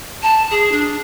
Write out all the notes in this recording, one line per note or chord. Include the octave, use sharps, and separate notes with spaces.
A5
G#4
D4